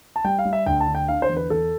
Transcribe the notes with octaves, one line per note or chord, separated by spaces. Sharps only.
A5
G3 G5
F5
G3
E5
D2 G5
A5
D3
G5
D3 F5
C5
E2
B4
E2 A4